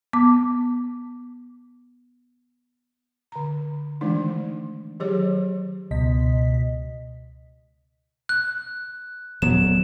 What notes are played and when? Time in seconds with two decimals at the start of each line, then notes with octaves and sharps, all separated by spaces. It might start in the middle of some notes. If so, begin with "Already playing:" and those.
0.13 B3 D6
3.32 D3 A#5
4.01 D#3 E3 G#3 A3 D4 D#4
5.00 D#3 F#3 G4 G#4 C#5
5.91 C#2 B2 D#5 B6
8.29 F#6
9.42 D#1 F#3 B3 E7